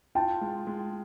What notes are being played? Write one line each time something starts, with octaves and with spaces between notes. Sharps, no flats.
F4 G5 A5
G#3
G#3